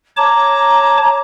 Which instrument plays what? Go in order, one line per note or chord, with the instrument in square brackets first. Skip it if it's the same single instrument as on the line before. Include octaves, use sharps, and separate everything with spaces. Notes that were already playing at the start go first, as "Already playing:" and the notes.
[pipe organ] C#5 A5 D6 [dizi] A#5